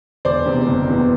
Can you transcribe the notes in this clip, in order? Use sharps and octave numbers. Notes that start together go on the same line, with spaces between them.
E1 C5 D5
E2 C3
F#1
E2 B2